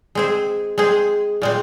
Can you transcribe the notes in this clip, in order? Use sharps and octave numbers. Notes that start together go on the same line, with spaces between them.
G#3 C4 G#4
G#3 C4 G#4
A#2 G#3 C4